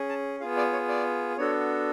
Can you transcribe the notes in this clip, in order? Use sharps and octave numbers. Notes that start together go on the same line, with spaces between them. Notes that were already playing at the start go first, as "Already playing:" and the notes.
Already playing: C#4 G#4
A5
B3 F4 G#4 F5
D5
C#5
D5
B3 D4 F#4 A4 C#5